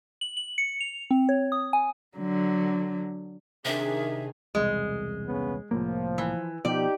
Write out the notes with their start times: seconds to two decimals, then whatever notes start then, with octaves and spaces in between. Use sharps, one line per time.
0.21 F#7
0.37 F#7
0.58 C#7
0.81 F7
1.11 C4
1.29 C#5
1.52 D#6
1.73 G#5
2.17 D3 F#3
3.65 C3 D#3 D4 G#4 E5
4.55 E1 C2 G#3
5.26 C#3 B3 C#4
5.71 C2 A2 F3 A#3
6.18 E3
6.65 B2 F3 D#4 G4 D5